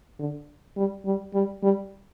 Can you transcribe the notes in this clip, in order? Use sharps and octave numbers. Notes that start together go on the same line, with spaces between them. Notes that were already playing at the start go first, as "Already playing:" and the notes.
D3
G3
G3
G3
G3